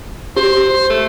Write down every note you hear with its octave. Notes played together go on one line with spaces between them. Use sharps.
G4 C5
A3